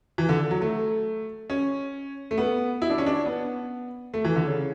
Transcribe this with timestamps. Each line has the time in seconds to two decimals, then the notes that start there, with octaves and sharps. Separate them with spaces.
0.18 E3
0.29 D3
0.51 F#3
0.62 A3
1.50 C#4
2.31 A3
2.38 B3
2.82 E4
2.90 D4
2.98 C#4
3.06 D4
3.26 B3
4.14 A3
4.25 E3
4.36 D3
4.46 C#3